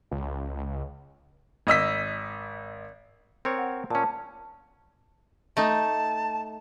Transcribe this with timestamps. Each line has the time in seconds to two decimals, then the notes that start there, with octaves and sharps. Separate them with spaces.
0.11 C#2
1.67 G#1 D#5 E6 B6
3.45 C4 A#4 C#5
3.58 F#5
3.90 A#2 C#4 A5
5.57 A3 D#4 A5